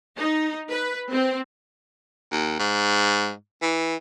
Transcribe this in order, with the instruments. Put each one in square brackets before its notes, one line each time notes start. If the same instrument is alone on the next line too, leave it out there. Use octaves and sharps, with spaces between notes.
[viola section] D#4
B4
C4
[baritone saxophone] D#2
G#2
E3